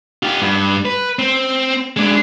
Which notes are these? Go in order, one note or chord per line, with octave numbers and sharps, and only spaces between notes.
F4 G4
G2
B4
C4
G#3 D4